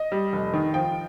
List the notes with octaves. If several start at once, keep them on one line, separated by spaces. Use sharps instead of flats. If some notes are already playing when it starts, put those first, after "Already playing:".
Already playing: D#5
G3
F1
D#3
F3 G5